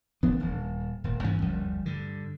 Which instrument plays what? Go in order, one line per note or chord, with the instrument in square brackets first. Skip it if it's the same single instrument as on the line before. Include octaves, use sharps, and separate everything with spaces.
[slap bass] D#1 F3 B3 D4
D#1
D#1 A#2
G2 E3 C#4
F#1 D2 F3 G3
G2 D3